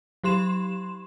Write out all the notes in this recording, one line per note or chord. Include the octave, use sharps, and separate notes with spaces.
F#3 G4 C6 E7